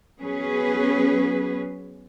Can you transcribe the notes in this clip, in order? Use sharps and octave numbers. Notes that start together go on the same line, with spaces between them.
F#3 B3 C#4 G#4 B4